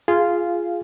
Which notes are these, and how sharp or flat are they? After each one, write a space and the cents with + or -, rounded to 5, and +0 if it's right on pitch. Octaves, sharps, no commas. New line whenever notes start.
F4 -10 G#4 +0 F5 +0